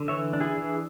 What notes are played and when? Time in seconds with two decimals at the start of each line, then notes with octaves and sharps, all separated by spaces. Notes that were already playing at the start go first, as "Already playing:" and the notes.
Already playing: D3
0.08 E3 C#5 E5
0.33 D4
0.41 E4 G#4
0.58 E3